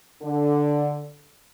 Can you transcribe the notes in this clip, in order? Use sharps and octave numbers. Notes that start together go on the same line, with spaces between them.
D3